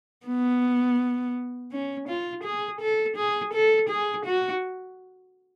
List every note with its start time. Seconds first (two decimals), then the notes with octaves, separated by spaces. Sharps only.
0.26 B3
1.72 C#4
2.08 F4
2.44 G#4
2.81 A4
3.16 G#4
3.53 A4
3.89 G#4
4.26 F#4